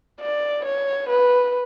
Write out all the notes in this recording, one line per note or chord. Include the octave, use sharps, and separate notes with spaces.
D5
C#5
B4